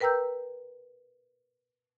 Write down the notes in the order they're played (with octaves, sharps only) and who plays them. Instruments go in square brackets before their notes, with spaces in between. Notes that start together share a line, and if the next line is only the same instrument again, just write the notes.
[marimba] A#4 B4 G5 A#5 E6 G6